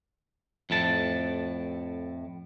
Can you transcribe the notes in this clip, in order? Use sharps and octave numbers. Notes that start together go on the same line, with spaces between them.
F2 A2 A5